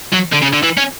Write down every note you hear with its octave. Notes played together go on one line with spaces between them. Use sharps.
F#3
D3
C#3
D3
E3
C#4